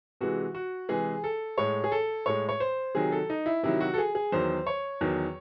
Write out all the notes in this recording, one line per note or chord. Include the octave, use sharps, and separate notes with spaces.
C3 E3 G#3 F#4
F#4
C3 E3 G#3 G#4
A4
A2 G#3 C#5
G#4
A4
A2 G#3 C#5
C#5
C5
C3 D#3 F#3 G#4
A4
D#4
E4
C3 D#3 F#3 E4
F#4
A4
G#4
G#4
E2 D#3 F#3 C5
C#5
E2 D#3 F#3